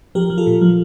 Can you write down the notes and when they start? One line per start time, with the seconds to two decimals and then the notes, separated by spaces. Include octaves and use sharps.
0.15 F3 G4 A#4
0.30 F3
0.38 F4 A4
0.47 A#2
0.61 F3